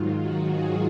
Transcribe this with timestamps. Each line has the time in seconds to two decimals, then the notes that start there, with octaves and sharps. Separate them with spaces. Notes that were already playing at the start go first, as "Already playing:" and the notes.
Already playing: G#2 D#3 F#3 F4
0.20 F#4
0.50 G#4